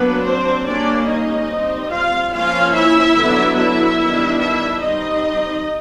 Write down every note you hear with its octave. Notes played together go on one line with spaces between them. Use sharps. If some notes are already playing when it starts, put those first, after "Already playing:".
Already playing: F#3 A#3 B3 D4 B4
C4 C5
G3 A#3 C#4 D4 D5
D#4 D#5
G3 C4
F4 F5
F3 A#3 C#4 F4 F5
E4 E5
D3 F#3 B3 D4
E4 E5
D#3 G3 B3 D4
E4 E5
G3 C4 D#4 D#5